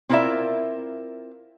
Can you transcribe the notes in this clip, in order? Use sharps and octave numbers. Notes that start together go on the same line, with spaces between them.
C4 E4 F4 A#4 D5 E5